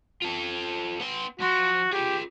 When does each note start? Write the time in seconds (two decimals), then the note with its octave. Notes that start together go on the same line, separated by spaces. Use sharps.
0.22 F4 A4
1.00 B3 C6
1.40 F3 F#4 C6
1.93 F4 G4 G#4